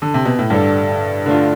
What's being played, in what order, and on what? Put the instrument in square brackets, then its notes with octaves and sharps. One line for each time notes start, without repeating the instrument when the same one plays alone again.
[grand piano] D3
C3
B2
A2
[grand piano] G2 [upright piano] D3 G3 D4 A4
[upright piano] D3 A3 D4 F4